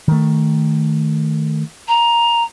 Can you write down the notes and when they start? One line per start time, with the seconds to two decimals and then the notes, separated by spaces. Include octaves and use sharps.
0.08 D#3 A3
1.88 A#5